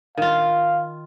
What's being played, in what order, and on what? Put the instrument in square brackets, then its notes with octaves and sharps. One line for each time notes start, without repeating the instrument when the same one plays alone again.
[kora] D#3 F4 [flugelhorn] F5